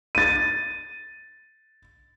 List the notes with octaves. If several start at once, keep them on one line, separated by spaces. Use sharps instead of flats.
A6 D#7